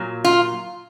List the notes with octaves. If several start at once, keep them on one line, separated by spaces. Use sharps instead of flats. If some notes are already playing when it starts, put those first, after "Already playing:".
Already playing: A#2 F#3
F4